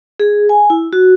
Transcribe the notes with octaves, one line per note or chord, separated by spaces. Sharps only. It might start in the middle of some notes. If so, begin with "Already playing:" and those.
G#4
G#5
E4
F#4